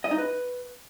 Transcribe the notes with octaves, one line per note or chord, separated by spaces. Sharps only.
D#5
D#4
B4